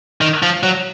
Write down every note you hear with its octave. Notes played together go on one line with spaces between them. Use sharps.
D#3
F3
F#3